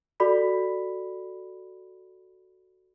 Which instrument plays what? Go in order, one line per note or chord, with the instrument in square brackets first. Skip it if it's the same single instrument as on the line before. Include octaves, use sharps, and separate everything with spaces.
[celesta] F#4 A4 D5 B5 B6